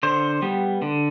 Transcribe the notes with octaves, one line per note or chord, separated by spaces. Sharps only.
D3 C5
G3 B3
D3